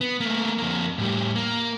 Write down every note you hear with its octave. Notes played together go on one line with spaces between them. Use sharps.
B3
A3 A#3
F2 A#3
A2 G3
A#3